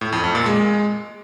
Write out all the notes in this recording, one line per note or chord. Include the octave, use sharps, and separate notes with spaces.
A2
F2
F2
A#2
G#3